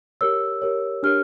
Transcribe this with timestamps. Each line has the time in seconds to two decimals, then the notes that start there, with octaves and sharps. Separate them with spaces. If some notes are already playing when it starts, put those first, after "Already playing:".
0.21 G4 A#4 C#5 E6
0.62 G4 A#4 C#5
1.03 D4 G4 A#4 C#5 F6